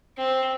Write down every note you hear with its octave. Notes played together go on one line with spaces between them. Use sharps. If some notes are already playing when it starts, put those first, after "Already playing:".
C4